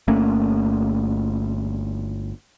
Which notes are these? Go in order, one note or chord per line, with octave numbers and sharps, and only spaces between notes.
G1 A3 A#3 C#4